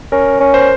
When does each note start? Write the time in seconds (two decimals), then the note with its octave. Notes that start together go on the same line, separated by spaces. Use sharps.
0.12 C#4 A#4
0.40 C#4
0.54 C5